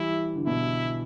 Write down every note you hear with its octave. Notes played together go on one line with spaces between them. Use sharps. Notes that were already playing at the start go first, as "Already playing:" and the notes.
Already playing: E3 G3 E4
D3
B2 E4